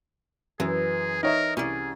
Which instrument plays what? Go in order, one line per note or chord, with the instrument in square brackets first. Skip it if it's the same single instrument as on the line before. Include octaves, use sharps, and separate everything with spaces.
[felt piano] F#2 [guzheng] E3 [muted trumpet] G#4
[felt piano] D#4 C#5 E5 [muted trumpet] A#4
[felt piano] C2 [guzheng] C#4 D5 [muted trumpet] G#4